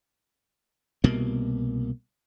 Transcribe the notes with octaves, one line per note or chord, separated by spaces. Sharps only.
C2 B2 A#3